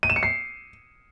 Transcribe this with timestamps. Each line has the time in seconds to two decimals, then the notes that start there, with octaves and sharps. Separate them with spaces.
0.03 D#7
0.10 E7
0.16 C#7
0.23 C7